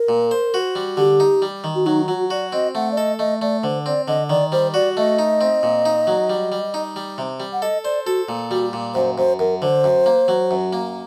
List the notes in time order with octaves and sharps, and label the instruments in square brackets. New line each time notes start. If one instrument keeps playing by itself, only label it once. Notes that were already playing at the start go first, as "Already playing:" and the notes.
Already playing: [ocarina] A#4
[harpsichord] A#2
C5
F#4
G3
[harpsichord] D3 [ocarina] G4
[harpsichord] D#4
G3
D#3
[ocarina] F#4
[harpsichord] F#3 [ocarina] D#4
[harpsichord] F#3 [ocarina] F#4
[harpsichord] F#4 [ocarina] D5
[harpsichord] C4 [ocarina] D#5
[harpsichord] A3 [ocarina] F#5
[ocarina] D5
[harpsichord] A4 [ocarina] D#5
[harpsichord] A3 [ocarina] D#5
[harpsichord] A3 [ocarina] D5
[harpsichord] D3 [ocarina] C5
[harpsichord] C4 [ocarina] D5
[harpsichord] D3 [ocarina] D#5
[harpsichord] D#3 [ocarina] D5
[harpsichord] G3 [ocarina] C5
[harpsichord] F#4 [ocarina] D5
[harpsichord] A3 [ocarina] D#5
[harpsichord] D#4
C4
A#2
D#4
F#3
G3
G3
D#4
G3
C3
G3
[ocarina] F#5
[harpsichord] A4 [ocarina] D#5
[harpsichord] C5 [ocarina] D5
[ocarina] F#4 [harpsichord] A4
[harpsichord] A#2
[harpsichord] G3 [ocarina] F#4
[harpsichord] A#2
[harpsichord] F#2 [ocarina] C5
[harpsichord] F#2 [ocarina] C5
[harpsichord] F#2 [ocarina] A#4
[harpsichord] D3 [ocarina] C5
[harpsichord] F#2
A#3
F#3
F#2
A#3